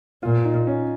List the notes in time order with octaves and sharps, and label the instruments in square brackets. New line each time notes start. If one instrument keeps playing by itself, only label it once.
[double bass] A#2 [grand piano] F4
[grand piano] D#4
C#4